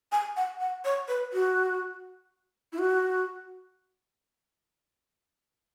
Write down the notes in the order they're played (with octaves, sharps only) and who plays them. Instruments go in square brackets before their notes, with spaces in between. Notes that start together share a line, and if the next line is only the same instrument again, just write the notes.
[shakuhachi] G#5
F#5
F#5
C#5
B4
F#4
E4
F#4